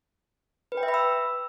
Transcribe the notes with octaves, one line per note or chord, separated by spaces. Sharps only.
B4
G5
E5
B5
E6